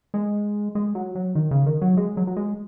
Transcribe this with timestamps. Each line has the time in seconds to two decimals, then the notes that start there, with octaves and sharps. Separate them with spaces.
0.14 G#3
0.75 G#3
0.95 F#3
1.15 F#3
1.35 D#3
1.51 C#3
1.66 D#3
1.81 F#3
1.97 G#3
2.17 F#3
2.27 F#3
2.37 G#3